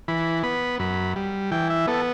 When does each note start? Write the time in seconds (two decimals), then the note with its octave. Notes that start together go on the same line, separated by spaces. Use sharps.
0.08 E3 B5
0.43 B3 B5
0.79 F#2 B5
1.16 G3
1.51 E3 G5
1.70 E5
1.87 B3 A4